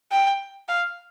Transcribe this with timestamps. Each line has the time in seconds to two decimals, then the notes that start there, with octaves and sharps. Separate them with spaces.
0.12 G5
0.68 F5